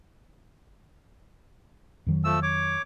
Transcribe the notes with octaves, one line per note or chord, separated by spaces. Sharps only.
F2 D#3 F#3
F3 A3 E6
C#5 D6